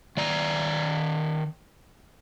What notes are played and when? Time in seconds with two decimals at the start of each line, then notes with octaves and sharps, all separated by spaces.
0.17 D#3 D5 A#5